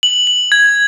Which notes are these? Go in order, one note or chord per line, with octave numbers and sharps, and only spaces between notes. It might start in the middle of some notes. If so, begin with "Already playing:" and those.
F#7
F#7
G#6